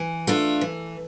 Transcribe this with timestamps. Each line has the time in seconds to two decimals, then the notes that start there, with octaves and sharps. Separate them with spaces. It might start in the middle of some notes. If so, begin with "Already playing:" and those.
Already playing: E3
0.27 A3 D4 F4
0.61 E3